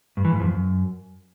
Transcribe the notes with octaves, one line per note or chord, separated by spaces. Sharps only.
G2
E3
G#2
F2
F#2